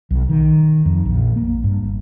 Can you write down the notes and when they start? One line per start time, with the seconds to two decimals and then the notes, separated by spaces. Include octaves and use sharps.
0.10 B1
0.29 D#3
0.85 F2
1.05 A#1
1.36 A#3
1.64 G2
1.84 G1